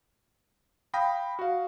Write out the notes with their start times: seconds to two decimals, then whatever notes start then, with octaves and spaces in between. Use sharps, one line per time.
0.94 F5 G5 B5 D#6 A#6
1.39 F#4 F5